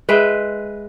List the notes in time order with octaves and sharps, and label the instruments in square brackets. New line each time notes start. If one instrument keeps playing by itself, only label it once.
[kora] G#3 B4 E5 G5